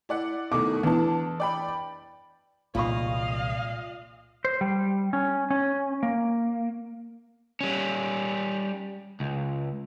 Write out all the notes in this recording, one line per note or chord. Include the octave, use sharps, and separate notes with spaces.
E4 D5 F#5
B2 D#3 A3 D6
E2 D4 A5
D5 G5 B5
E1 C2 A#2 F4 D#5 F5 B5 C#6
C5
G3
C#4
C#4
A#3
G3 C#4
C#2